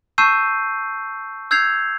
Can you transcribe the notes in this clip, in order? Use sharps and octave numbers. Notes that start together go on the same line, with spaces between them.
A5 C#6 E6 G6 C7 D#7
E6 G6 G#6 C7 F7